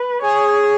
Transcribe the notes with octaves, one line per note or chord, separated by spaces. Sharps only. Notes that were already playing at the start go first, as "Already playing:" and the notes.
Already playing: B4
G#4 C#5